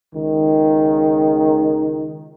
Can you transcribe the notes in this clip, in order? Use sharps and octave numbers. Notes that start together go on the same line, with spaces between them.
C#2 D#3